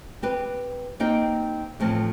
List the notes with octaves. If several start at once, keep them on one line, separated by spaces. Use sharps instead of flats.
C4 G4 B4
A#3 C4 D#4 G4 G5
E2 A2 F3 C4